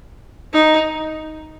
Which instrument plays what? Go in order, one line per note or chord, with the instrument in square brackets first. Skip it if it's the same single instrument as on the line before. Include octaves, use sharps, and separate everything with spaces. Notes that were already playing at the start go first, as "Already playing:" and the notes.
[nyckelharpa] D#4